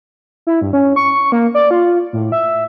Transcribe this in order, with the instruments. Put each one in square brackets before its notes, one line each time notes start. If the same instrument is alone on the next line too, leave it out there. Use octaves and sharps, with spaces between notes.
[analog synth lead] E4
G2
C#4
C#6
A#3
D5
F4
A2
E5